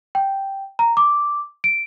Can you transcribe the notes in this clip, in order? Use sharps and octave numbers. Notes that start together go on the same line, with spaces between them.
G5
A#5
D6
D7